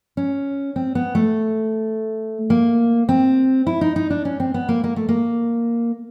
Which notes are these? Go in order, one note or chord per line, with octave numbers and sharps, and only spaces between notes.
C#4
C4
B3
A3
A#3
C4
E4
D#4
D#4
D4
C#4
C4
B3
A#3
A#3
A3
A#3